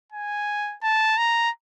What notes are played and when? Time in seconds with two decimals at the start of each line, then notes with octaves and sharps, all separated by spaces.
0.12 G#5
0.83 A5
1.18 A#5